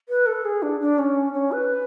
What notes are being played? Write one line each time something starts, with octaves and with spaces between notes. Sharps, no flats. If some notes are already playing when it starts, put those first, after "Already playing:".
B4
A4
G#4
D4
D4
C#4
C#4
B4